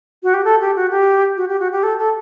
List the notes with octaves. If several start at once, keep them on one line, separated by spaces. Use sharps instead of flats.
F#4
G4
A4
G4
F#4
G4
F#4
G4
F#4
G4
A4
A4